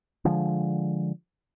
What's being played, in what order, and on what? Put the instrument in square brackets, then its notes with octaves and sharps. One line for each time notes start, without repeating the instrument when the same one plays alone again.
[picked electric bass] D3 F3 G#3